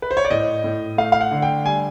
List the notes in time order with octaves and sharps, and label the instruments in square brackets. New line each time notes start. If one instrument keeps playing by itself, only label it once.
[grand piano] B4
C5
C#5
D5
A2 D#5
A2
A3 F5
F5
F#5
D3
G5
G3 G#5